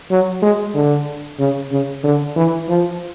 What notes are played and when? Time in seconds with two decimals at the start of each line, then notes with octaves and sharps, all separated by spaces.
0.10 F#3
0.42 G#3
0.75 D3
1.39 C#3
1.71 C#3
2.04 D3
2.36 E3
2.69 F3